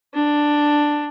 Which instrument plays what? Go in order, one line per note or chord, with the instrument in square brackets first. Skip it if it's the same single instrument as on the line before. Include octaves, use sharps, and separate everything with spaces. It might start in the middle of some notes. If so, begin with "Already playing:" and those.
[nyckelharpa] D4